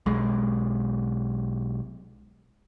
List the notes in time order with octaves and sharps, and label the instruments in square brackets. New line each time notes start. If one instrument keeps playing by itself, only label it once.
[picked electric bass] B1 G#3